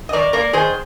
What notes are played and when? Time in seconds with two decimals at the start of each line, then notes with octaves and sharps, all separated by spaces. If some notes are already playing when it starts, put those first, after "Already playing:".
0.09 D#5
0.13 D#3 A#4 D5
0.33 A#3 A#4 D5
0.53 D#3 G#4 C5